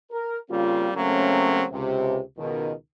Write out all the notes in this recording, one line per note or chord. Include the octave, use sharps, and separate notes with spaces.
A#4
C#3 G3 A#3 C4 F4
C#3 F#3 A3 A#3 C4 C#4
C#2 C3
C#2 B2 D#3